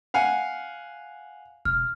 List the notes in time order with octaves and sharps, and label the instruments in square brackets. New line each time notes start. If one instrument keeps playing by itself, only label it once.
[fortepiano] F5 F#5 G#5
[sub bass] E1 [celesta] F6